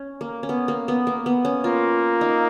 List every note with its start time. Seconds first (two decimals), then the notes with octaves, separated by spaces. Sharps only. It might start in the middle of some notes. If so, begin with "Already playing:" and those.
Already playing: C#4
0.21 A#3
0.43 C#4
0.49 B3
0.68 A#3
0.88 B3
1.07 A#3
1.26 B3
1.45 C#4
1.64 A#3 F4
2.21 D#4